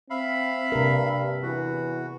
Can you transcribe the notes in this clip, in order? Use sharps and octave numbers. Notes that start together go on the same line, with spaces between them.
C4 E5 F5 B5
G2 C3 A#4
E2 F#4